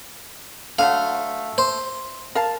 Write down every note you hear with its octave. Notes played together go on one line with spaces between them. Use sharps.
D3 F#3 A3 F5
C5
A#4 F5 A5